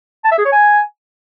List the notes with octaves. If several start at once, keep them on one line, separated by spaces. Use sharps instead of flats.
A5
E5
G#4
C#5
G#5